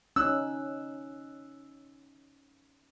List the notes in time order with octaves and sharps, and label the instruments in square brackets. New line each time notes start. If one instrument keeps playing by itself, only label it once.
[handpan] C#4 D#4 [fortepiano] E6 F#6